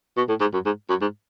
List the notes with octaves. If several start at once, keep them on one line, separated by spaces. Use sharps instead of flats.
B2
A2
G#2
F#2
G#2
F#2
G#2